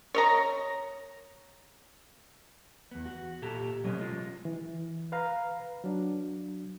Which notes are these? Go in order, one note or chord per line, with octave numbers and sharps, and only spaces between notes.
C#5 D#5 A#5
E2 B3
F#4
A#2 G4 A4 A#5
B2 F#3 G#3 C4 C#4
G#3 F4
E3
B4 F5 A#5
F#3 D4